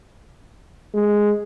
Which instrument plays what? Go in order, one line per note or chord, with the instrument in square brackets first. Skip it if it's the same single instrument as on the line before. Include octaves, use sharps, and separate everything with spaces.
[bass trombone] G#3